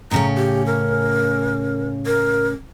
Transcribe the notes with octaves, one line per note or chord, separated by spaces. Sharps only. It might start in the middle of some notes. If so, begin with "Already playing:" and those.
A2 C#3 C#4 A#5
G4
A#4
A#4